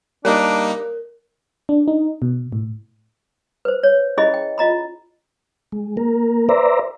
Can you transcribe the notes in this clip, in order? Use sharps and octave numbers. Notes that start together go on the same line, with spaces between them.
G3 A#3 D4 D#4 A#4
D4
D#4
B2
A2
B4 C5
C#5
C#4 E4 G#4 D#5 B5
G5
F4 D#5 A#5 B5
G#3
A#3 A#4
B4 C5 D5 E5 A#5